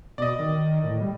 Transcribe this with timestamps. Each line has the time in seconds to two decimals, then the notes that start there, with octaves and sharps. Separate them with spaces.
0.18 B2 D5 D#5
0.39 D#3
0.84 A2
1.01 G3